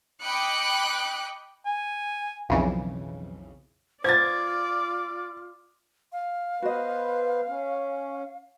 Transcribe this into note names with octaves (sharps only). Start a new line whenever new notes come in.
D#5 G5 B5 D6 F#6 C#7
G#5
B1 F2 C#3 E3
F4 C5 D5 G#6 A6
F5
B3 F#4 B4 C5 D#5
C#4